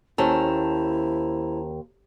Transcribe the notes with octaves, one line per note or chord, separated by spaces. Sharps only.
D#2 C#4 E4 A4 C5 A5 A#5